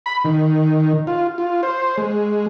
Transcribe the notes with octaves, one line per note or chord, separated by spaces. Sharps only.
B5
D#3
F4
F4
C5
G#3